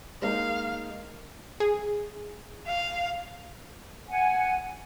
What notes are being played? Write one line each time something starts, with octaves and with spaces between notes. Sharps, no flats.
G#3 A#3 D#4 F5
G#4
F5
F#5 G#5